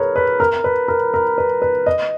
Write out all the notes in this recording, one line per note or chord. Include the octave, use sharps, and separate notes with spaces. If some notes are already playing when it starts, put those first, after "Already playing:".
Already playing: G#4 A#4 B4 C#5
B4
A#4
B4
A#4
A#4
B4
B4
D#5